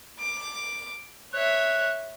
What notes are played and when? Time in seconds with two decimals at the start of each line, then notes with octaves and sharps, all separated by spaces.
0.19 D6
1.33 C#5 E5 F#6